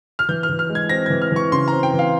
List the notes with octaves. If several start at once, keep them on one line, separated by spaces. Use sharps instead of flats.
F6
E3 G6
F6
E3
F6
G#3
G#6
C4 A#6
E3 G#6
F6
E3 C#6
C#3 C6
C4 A#5
G5
E3
F5